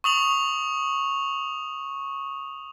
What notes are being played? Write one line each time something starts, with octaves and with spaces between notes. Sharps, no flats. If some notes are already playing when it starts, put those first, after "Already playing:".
C#6 D#6 F7 F#7